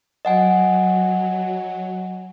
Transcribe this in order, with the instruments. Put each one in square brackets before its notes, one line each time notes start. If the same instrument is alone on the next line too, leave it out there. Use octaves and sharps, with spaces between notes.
[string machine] F#3 [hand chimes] D#5 F#5 G#5